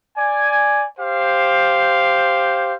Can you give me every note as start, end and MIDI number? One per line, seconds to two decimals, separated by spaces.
0.17 0.85 74
0.17 0.85 80
0.99 2.74 67
0.99 2.74 72
0.99 2.74 77